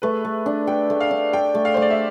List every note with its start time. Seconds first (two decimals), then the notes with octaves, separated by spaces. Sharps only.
0.02 A3 B4
0.25 A3
0.46 D4
0.67 A4 G5
0.90 A3
1.00 F5
1.11 D4
1.33 A4 G5
1.55 A3
1.65 F5
1.74 A3 C5
1.82 D5
1.90 E5